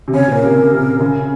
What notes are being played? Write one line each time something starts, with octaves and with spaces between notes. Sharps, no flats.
C3
C#3 C#5
A#2 C5
A#4
C3
C#3
C3
C#3